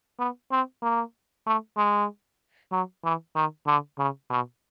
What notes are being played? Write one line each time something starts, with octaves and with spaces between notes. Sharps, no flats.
B3
C4
A#3
A3
G#3
F#3
E3
D#3
D3
C#3
B2